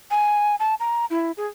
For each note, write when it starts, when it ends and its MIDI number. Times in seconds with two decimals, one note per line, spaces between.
0.11 0.55 80
0.60 0.75 81
0.80 1.05 82
1.10 1.32 64
1.37 1.47 68